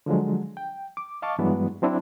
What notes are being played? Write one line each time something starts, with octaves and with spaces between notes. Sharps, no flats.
D3 F3 F#3 G#3
G5
D6
D#5 F5 A5 C#6 D6
G2 E3 F#3 G#3 B3 D4
F#3 C4 D4 E4